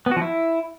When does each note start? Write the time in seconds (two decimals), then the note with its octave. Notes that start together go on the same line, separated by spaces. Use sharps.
0.06 B3
0.11 F#4
0.16 F3
0.22 E4